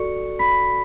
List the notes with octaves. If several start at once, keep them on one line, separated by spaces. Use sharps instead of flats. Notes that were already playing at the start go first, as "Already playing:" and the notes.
Already playing: F#4 A4 D5 C#6 C#7
B5 B6